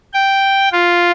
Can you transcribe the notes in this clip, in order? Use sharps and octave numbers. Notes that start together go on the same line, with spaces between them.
G5
F4